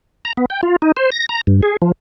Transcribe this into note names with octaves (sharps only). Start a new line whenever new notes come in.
A#5
B3
G5
F4
D#4
C5
A#6
A#5
G2
G#4
F3